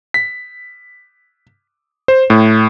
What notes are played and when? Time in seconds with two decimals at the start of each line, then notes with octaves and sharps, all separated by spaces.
0.14 B6
2.08 C5
2.30 A2